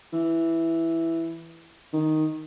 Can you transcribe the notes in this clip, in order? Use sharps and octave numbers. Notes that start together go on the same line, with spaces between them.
E3
D#3